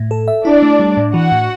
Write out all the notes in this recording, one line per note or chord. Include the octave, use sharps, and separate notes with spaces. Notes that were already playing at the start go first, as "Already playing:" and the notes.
Already playing: A2
A4
E5
D4 E4 D5
A3
G3
A2
E3 F#4 F#5
A2